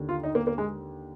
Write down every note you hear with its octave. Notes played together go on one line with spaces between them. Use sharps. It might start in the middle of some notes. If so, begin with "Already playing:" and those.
Already playing: D#2 D3
F4
D#4
A#3
A#3
G#3